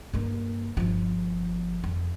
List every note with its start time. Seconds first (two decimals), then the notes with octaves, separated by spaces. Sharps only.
0.14 G2 A#3
0.77 G1 F3
1.84 F2